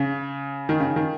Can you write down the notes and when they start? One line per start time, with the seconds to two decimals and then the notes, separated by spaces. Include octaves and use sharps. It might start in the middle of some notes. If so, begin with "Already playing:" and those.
Already playing: C#3
0.69 D#3
0.80 C#3
0.96 D#3